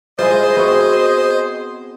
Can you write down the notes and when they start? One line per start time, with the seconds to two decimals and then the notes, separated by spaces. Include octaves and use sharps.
0.19 G#3 E4 F4 G#4 C5 D#5
0.57 B3 C4 F#4